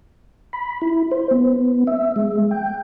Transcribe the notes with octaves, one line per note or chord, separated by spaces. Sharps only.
B5
E4
C5
B3
E5
G#3
G5